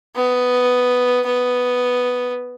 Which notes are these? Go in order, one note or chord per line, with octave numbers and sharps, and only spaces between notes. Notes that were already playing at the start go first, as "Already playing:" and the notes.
B3
B3